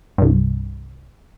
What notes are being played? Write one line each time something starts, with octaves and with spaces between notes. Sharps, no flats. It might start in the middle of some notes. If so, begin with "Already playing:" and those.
C2 G2